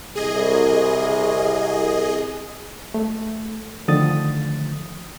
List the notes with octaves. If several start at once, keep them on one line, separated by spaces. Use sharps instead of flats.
C2 G#4 D#5
A3
D3 D#3 F3 A3 D#6 A6